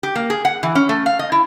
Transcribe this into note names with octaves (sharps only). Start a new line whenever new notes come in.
G4
A#3
G#4
F#5
E3
C#4
A3
F5
D#5
E4